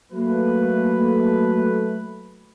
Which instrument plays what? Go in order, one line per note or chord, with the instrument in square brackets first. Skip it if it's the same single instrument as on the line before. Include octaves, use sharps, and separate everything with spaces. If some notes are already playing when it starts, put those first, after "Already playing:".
[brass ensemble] F#3 A3 B4 [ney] A#3